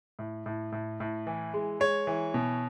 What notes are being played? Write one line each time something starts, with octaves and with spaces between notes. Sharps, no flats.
A2
A2
A2
A2
E3
G#3
G#3 C#5
E3
B2